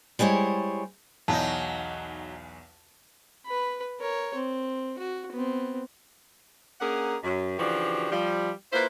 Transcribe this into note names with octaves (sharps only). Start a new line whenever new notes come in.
G3 G#3 E4 C5 C#5
B1 E2 F#3 D#4 A5
B4 B5
A#4 C#5
C4
F#4
B3 C4
A#3 C#4 D4 G#4 A#4 F#5
F#2
C#3 E3 F3 D4 F#4 G4
F3 G3
A#3 E4 F4 B4 C5